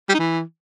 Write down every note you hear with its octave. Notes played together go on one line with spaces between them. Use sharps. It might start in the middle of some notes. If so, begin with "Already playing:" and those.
G3
D#4
E3